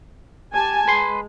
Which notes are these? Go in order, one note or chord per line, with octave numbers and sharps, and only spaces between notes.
G4 G#5 A5
G#3 B4 C6